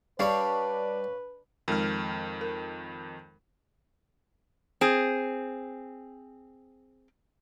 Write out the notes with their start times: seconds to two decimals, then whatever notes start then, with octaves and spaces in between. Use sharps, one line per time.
0.19 G3 D4 B4 C#5 F5 B5
1.68 F2 D#3 G#3 A#4 F6
2.41 A#4
4.81 C4 G#4